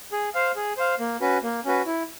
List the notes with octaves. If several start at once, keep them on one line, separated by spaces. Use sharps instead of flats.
G#4
C5 F5
G#4
C5 F5
A#3
C#4 F#4 B4
A#3
C#4 F#4 B4
E4